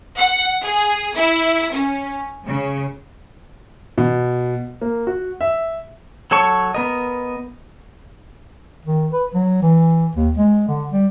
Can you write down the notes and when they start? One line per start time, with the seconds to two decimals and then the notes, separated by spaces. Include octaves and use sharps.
0.18 F#5
0.62 G#4
1.15 E4
1.72 C#4
2.46 C#3
3.98 B2
4.81 A#3
5.07 F#4
5.41 E5
6.31 F#3 A4 C#5 A5 C#6
6.74 B3 A#4 D#5
8.85 D#3
9.12 B4
9.34 F#3
9.62 E3
10.15 D#2
10.37 G#3
10.68 D3
10.91 G3